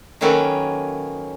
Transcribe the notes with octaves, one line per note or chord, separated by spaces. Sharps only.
D#3 F#3 A#3 C#4 A4 B4